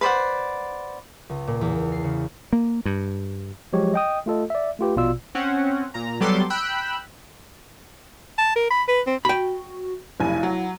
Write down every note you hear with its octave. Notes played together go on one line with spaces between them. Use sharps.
B4 C5 D5 F#5
C#2
A#2
E2
C7
C#3
A#3
G2
F3 F#3 G#3 G4 C#5
D#5 G5 D#6
A3 F4 A4 D#5
D5 E5
A3 F4 G4 B4
A#1 B2 F4 D5 E6
C4 C#4 F#5
A#2 A#5
F#3 G3 B3 A4 C6 D6
G5 B5 E6 F#6
A5
A#4
B5
B4
C4
F#4 G5 B5
F1 B1 E4 G#5
F#3